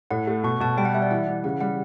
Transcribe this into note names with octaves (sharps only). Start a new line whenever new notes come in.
A2 F#5
A3
B2 C#6
B2 A5
G3 G5
F#5
G3 E5
D5
E3 F#5
E3
C#3 F#5
G3 F#5